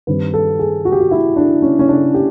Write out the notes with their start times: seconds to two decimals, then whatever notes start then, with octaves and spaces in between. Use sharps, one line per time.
0.07 G2 D#3 G3 C4 B4
0.34 A4
0.59 G#4
0.85 F#4
0.92 G4
1.00 F#4
1.11 E4
1.36 D4
1.62 C#4
1.79 C#4
1.89 D4
2.14 G4